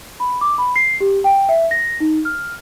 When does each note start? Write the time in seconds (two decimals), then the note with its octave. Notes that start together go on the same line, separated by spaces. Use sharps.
0.20 B5
0.41 D6
0.58 B5
0.76 C7
1.00 G4
1.24 G5
1.49 E5
1.71 A#6
2.00 D#4
2.25 F6